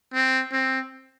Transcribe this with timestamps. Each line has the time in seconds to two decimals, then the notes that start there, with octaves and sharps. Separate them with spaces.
0.14 C4
0.52 C4